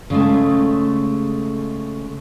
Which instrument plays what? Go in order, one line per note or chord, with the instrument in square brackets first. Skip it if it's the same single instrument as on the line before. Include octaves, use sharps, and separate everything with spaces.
[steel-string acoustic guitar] C#3 G#3 A3